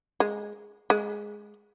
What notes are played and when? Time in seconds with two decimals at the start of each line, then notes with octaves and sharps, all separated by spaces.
0.20 G#3
0.90 G#3